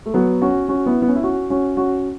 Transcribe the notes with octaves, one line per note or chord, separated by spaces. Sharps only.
A3
F#3 B3
C#4 F#4
C#4 F#4
B3 E4
B3
C#4
E4
C#4 F#4
C#4 F#4
C#4 F#4